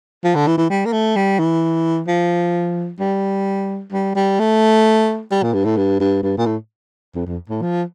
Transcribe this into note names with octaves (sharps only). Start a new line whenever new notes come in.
F3
D3
E3
E3
G3
A#3
A3
G3
E3
F3
G3
G3
G3
A3
G3
A#2
G2
A2
G2
G2
G2
A#2
A2
F2
F2
A2
F3